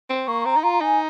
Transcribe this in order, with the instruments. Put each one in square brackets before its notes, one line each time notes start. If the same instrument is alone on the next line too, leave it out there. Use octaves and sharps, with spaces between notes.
[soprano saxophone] C4
[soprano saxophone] A#3 [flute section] C#6
[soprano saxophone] C4 [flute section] A#5
[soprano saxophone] D#4
[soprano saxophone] F4 [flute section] A#5
[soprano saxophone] D#4 [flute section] G#5